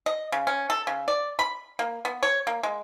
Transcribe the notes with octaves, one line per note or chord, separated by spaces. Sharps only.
D#5
C#3
C#4
A4
C#3
D5
B5
A#3
B3
C#5
A#3
G#3